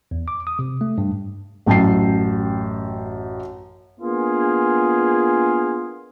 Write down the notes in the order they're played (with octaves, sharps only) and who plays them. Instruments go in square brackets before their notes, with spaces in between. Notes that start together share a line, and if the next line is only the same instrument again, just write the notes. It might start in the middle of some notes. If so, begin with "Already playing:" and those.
[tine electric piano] E2
D6
D#6
C3
A3
G2
[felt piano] A1 F#2 G5 A5 C7
[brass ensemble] A#3 B3 D4 F4 G#4